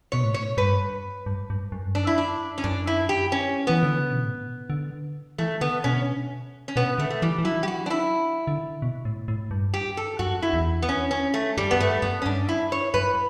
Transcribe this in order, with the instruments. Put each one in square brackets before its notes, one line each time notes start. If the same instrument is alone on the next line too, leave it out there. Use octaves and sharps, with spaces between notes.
[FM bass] B2 [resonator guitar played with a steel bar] C#5
[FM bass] A2
[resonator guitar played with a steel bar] C#5
[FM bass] G2 [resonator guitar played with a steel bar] B4
[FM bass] G2
G2
F#2
G2
[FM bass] F#2 [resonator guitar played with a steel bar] D4
[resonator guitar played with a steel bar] E4
D4
C#4
[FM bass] F#2 [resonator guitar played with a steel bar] D4
[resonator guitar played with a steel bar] E4
G4
C#4
[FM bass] E3 [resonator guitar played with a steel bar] B3
[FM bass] D3
C#3
B2
A2
D3
[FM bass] E3 [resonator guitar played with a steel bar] A3
[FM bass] D3 [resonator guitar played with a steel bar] B3
[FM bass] B2 [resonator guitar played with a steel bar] C#4
[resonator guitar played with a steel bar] C#4
[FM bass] B2 [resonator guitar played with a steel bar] B3
[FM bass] D3 [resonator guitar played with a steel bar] A3
[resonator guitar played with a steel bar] A3
[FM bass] E3 [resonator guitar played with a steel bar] G3
[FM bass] E3
[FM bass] F#3 [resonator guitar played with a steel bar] E4
[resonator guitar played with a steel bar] G4
F#4
D4
E4
[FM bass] D3
B2
A2
A2
G2
[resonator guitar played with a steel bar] G4
A4
[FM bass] F#2 [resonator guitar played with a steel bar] F#4
[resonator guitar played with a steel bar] E4
[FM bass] E2
[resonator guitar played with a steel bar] B3
C#4
C#4
A3
[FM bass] F#2 [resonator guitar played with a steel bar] G3
[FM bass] F#2 [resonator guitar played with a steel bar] B3
[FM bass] G2 [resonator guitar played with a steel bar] A3
[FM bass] F#2 [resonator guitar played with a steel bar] B3
[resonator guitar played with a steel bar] C#4
[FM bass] G2 [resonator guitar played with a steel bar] D4
[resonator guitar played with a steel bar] E4
C#5
[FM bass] F#2 [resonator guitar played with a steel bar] B4